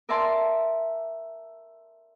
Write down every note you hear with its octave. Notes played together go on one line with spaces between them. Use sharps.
A#4 D5 E5 G#5 A5 C6